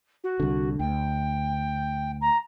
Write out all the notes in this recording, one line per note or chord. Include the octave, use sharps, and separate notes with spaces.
F#4
C2 D3
D2 G5
A#5